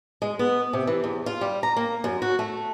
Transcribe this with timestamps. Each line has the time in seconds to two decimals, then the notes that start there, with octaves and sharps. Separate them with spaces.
0.22 G#3
0.39 B3
0.73 C3
0.87 E3
1.04 E2
1.26 F4
1.41 G3
1.63 A#5
1.76 A#3
2.04 F#2
2.22 F#4
2.39 A3